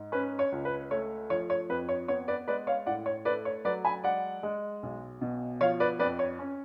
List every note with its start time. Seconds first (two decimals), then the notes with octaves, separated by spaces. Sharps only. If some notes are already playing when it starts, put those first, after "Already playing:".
Already playing: G#2
0.12 C#4 B4
0.39 C#5
0.52 C#2
0.65 B4
0.91 A3 C#5
1.30 F3 C#5
1.50 C#5
1.70 F2 B4
1.89 C#5
2.08 B3 C#5
2.28 B4 D5
2.48 G#3 B4 D5
2.67 C#5 F5
2.86 A2 D5 F#5
3.06 C#5
3.25 A3 B4 D5
3.45 C#5
3.65 F#3 B4 D5
3.85 G#5 B5
4.04 G#3 D5 F#5
4.43 G#3
4.83 B1
5.21 B2
5.61 F3 C#5 F5
5.80 B4 D5
5.99 F2 B4 D5
6.19 C#5
6.39 C#4